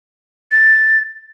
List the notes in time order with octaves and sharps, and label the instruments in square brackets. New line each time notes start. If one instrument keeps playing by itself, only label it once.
[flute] A6